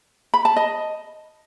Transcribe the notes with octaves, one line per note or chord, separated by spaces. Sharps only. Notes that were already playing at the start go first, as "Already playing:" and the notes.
B5
A5
D#5